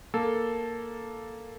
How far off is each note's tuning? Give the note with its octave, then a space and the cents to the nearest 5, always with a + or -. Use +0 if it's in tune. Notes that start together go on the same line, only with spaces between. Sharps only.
A#3 +0 A4 +0